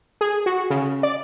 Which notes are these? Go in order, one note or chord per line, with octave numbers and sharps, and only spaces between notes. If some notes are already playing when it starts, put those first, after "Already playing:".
G#4
F#4
C#3
D5